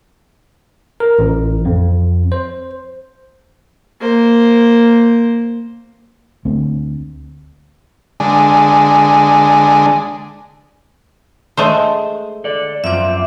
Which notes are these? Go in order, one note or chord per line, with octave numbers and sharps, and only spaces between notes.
A#4
A1
F2
C5
A#3 C5
D2 A3 C4
D3 G#3
G#3 A3 C5
A4 D5
F#2 F3 C4 E5 D6